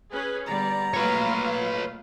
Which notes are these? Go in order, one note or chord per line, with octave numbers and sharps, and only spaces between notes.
C#4 G#4 B4
D3 G3 B3 D5 A#5
F#3 A3 A#3 F4 B4 C#5 F5